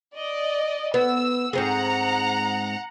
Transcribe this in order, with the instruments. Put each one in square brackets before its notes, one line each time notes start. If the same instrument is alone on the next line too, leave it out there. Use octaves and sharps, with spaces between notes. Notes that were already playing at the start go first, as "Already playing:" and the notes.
[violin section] D5 D#5
[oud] B3 [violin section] E6
[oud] G#2 C4 G#4 [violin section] F#5 A#5